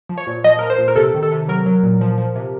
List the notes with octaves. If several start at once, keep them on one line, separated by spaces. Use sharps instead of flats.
F3
C#5
A#2
F3 D#5
F3 A#4
C5
A#2
A#4
C3 A4
D#3
A4
C3
F#3 A#4
F#3
A#2
F3
F3
C3